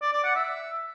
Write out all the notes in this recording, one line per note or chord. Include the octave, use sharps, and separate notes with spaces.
D5
D5
F#5
E5